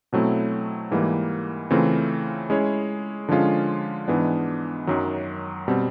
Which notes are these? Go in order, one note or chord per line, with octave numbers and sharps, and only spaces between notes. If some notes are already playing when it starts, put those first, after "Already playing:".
B2 F#3 A3 C4 E4
G#2 E3 G3 A#3
C#3 E3 A3 C4 F4
G#3 C#4 E4 G#4 C#5
D3 F3 G#3 C#4 F4
G#2 E3 G#3 B3 D4
F#2 D#3 F#3
B2 G3 C4